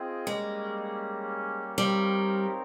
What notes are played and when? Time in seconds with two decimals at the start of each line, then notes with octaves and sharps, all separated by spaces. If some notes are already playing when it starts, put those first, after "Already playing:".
Already playing: C4 F4 G#4 D#5 G5
0.27 G3 G#3 A#3 C#4
1.78 G3 C4 D#4 A#4 C#5 F5